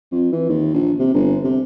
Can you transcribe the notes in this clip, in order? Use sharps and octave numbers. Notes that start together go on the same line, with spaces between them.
F2
E3
D#2
A#1
C3
G1
C3